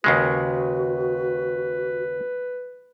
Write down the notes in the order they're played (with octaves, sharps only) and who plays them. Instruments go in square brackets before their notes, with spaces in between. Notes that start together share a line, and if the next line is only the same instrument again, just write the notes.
[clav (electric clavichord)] D#2 C#3 G#3 [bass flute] F#4 [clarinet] B4